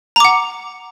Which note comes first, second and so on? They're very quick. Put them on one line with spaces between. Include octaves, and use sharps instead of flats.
A#5 D6 F#5